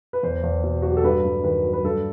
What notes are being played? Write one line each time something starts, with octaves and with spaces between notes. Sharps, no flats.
B4
E2 C5
E2
B2
F#3 F#4
G4
A4
G2 B4
G2
D#3 B4
F#3
B4
G2 A4